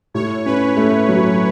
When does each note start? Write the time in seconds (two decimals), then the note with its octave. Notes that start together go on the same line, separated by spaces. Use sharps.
0.14 A2 C#5
0.46 C#4 B4
0.77 A3
1.09 F#3